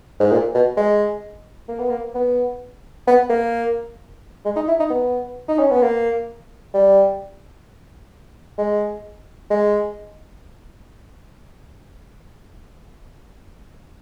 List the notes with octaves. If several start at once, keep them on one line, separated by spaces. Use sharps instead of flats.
G#2
A#2
B2
G#3
A#3
B3
A#3
B3
B3
A#3
G#3
D#4
E4
D#4
B3
D#4
C#4
B3
A#3
G3
G#3
G#3